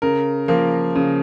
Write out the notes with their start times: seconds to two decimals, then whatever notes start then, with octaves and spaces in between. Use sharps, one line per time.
0.02 C#3 A#4
0.48 F3 A#3
0.95 C#3